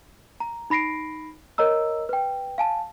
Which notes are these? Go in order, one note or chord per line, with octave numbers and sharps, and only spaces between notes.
A#5
D#4 B5 A#6 C7 D7
A#4 C#5 D#5 A#5 E6
B4 G5
F5 G#5 A5